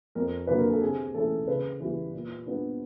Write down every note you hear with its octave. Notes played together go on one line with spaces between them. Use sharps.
F2 A#4
D3 F#3 A#3 B4
A#4
A4
C3 G#4
E3 A3 C#4 A4
C#3 B4
E3 G3
A#2
G3 B3 D4